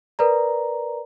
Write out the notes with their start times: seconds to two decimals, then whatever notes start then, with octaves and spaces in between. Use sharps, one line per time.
0.19 A#4 B4 D5 A#5